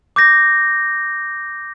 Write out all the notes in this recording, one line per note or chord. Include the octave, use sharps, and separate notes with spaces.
D6 G6 A#6